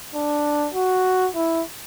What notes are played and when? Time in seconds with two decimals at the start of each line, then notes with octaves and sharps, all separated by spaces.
0.14 D4
0.75 F#4
1.35 E4